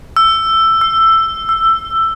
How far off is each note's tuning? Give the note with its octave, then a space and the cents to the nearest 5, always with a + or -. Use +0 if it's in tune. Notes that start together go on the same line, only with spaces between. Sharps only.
E6 +10
E6 +15
E6 +20